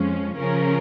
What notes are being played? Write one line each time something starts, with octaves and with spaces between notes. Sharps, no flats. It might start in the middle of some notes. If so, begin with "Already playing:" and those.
Already playing: F2 F3 G#3 C#4
C#3 F3 C#4 A#4